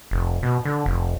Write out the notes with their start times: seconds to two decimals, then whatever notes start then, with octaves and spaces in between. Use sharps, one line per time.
0.11 F1
0.43 B2
0.65 D3
0.86 F1